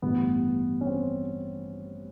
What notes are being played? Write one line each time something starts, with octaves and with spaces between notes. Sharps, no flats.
A1 G2 E3 B3
C#4
C4